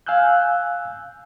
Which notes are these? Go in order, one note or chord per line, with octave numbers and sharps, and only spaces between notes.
F5 G#5 E6 F#6 G6